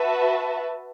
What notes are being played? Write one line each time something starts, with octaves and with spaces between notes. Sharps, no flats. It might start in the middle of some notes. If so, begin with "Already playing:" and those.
Already playing: F#4 B4 E5 A5